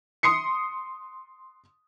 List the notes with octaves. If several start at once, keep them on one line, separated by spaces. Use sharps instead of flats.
C6 D#6 C7 C#7